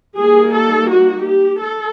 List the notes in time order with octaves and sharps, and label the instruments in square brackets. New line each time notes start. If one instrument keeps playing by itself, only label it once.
[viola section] G3 A#3 D#4 G#4
A4
F#4
G4
A4